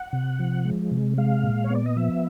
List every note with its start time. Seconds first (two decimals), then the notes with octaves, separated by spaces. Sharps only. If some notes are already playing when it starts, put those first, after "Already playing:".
Already playing: F#5
0.13 C3
0.39 F3
0.65 G#3
0.92 C3
1.18 G#3 F5
1.44 A#2
1.64 C#5
1.70 B3
1.75 D5
1.86 D#5
1.96 F3 E5